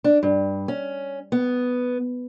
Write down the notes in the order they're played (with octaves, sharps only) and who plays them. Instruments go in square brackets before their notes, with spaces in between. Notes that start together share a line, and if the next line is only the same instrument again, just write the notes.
[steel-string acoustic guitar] D4
G2
C#4
B3